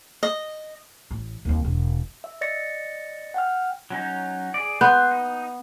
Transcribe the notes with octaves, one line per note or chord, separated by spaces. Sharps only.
D#5
A1
D#2 C4
E1
E5
D5 D#5 A6 A#6 C#7
F#5 G5 F6
F#3 C#4 D#4
G#4 D5
B3 C6 F#6 G6
D#4